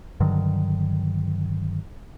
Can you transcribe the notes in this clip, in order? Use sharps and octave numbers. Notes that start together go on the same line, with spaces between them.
G2 D3 D#3 F#3